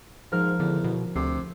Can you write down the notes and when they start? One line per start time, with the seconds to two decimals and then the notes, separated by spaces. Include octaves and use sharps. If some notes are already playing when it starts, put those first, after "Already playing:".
0.32 G#2 F3 A#4 F6
0.60 E2 D3
0.84 B2
1.16 D2 C3 C7